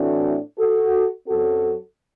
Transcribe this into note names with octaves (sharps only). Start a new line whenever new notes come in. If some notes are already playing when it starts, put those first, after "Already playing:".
Already playing: A2 E3 A3 C4 D4 F#4
F#4 A4
F#2 F#3 C4 F#4 A4